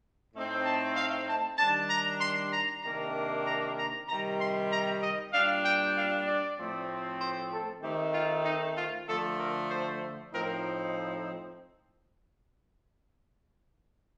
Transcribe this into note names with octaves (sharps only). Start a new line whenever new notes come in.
A2 A3 C4 D#4
A5
F5
A5
D#3 G3 D4 A5
A#5
C6
A#5
C3 D#3 A#3 D4 A#5
A#5
A#5
C3 D#3 G3 A#5
C6
A#5
D#5
A#2 G3 D4 F5
G5
F5
D5
A2 F3 A3 C4
C5
A4
D#3 A3 C4 D#4 G4
F4
D#4
F4
D3 F3 A3 A4
A#4
C5
A2 F3 C4 D#4 A#4